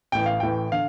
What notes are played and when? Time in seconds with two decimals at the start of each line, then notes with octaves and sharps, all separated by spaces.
0.12 A1 A2 E3 G5
0.26 F5
0.40 A1 A2 E3 G5
0.72 D3 F5